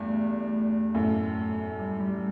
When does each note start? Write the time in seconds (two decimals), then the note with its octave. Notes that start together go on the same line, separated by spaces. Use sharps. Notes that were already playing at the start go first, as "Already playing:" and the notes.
Already playing: E2 G2 A3
0.95 F#2 A2
1.78 G3
1.99 G3